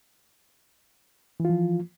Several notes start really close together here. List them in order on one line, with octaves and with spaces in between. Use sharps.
E3 F4 F3